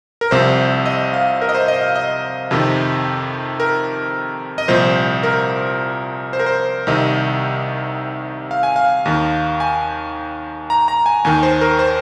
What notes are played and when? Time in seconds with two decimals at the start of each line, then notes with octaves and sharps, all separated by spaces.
0.21 A#4
0.31 C2 C3 F3 C5
0.86 D#5
1.14 F5
1.41 A#4
1.49 D#5
1.55 C5
1.68 D#5
1.81 F5
1.96 D#5
2.51 F2 C3 D#3
3.60 A#4
4.58 D#5
4.68 C2 A#2 F3 C5
5.23 A#4
6.33 C5
6.40 A#4
6.46 C5
6.87 C2 C3 D#3 D#5
8.51 F5
8.63 G#5
8.76 F5
9.05 D#2 D#3
9.60 G#5
10.70 A#5
10.88 A#5
11.06 G#5
11.25 D#2 D#3 G#5
11.43 C5
11.61 A#4
11.79 C5